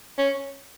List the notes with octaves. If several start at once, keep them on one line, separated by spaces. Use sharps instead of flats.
C#4